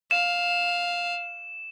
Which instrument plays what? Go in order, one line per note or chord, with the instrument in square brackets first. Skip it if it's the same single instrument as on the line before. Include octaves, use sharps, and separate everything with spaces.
[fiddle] F5 [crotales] E7